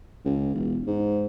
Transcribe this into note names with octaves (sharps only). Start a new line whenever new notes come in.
C#2
E1
G#2